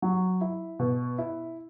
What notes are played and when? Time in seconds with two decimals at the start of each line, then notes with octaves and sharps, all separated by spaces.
0.02 F#3
0.41 E4
0.79 B2
1.18 E4